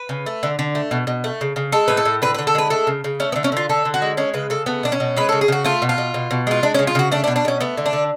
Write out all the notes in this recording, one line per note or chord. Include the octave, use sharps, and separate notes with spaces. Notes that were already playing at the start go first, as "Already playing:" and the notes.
Already playing: B4
C#3
A3
D3
D3
A3
B2
B2
A3
C#3
C#3
G#3 A4
A2 B4
A4
A2
D3 B4
B4
D3
A4
G#3 B4
A3 A4
C#3
C#3
A3 C#4
B3
D3
C#4
D3 F4
D3 A4
D3
F#4
G#3
G#3 C#4
C#3 B4
C#3 A4
A3 B3
B2 D4
C#4
B2
G#3 B4
C#3 A4
G#4
C#3 F#4
A3 F4
B2
F4
B2
B2
B2
G#3 F4
G#3 D4
C#4
C#3
F4
C#3 F#4
A3 D4
D4
B2
D4
B2 C#4
A3 B3
D3
D4
D3